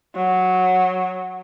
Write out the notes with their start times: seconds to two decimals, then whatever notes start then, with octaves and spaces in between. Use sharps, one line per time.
0.15 F#3